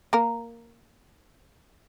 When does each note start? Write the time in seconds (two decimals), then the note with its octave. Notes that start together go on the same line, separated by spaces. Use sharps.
0.13 A#3 A#4